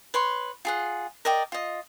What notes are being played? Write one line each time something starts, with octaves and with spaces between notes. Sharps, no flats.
B4 C#5 C6
F4 G#4 F#5
A#4 D5 D#5 G5
F4 D#5